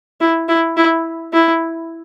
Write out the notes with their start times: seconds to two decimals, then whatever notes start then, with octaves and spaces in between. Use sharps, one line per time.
0.21 E4
0.48 E4
0.77 E4
1.33 E4